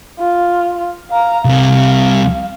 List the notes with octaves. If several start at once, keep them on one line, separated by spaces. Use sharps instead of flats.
F4
F5 A#5
C2 C3 F5